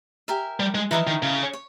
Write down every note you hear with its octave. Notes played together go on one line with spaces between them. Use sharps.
G4 A#4 E5 G#5
G3
G#3
E3 E4 A#4 D#5 A#5
D#3
C#3
C#5